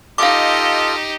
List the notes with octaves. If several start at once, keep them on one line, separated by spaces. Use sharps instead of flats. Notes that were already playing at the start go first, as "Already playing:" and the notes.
D#4 F4 G4 A4 D#5 F5 D6